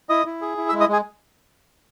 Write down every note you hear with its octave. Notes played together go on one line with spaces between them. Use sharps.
E4 D#5 D#6
E4
G#4
E4
E5 E6
G#3
D#5 D#6
G#3 G#4 G#5